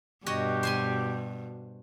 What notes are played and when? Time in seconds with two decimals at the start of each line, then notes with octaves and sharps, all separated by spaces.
0.26 G2 B2 F#4 G4 C#5 D#5
0.63 C5 G#5 C6